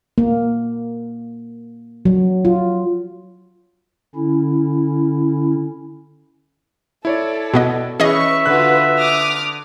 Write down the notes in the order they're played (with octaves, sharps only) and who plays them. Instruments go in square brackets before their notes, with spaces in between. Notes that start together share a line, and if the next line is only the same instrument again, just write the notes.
[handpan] A#3
F#3
F4
[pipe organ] D3 C#4 E4
[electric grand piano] E4 C#5 D5 [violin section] A4
[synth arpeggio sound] B2 B3 D#5
[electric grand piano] E3 C#4 [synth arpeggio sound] G#4 D#5 [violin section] B4 C#6 [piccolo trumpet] E5
[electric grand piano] D3 F#6 [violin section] F4 F#4 B4
[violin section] D6 D#6 F6